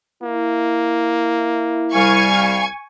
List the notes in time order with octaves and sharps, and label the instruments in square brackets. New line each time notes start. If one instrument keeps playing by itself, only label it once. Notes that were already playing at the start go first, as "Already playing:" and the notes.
[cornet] A#3 [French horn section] E4
[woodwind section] C2 G3 F5 [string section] G#5 C#6 G#6